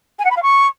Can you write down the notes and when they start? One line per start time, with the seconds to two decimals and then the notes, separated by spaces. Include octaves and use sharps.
0.19 G#5
0.25 F#5
0.31 B5
0.37 F5
0.43 C#6